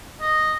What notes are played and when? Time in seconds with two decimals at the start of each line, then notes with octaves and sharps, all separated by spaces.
0.21 D#5